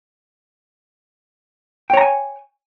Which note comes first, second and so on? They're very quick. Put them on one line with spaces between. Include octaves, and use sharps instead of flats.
G5 C#5 A#5 G#5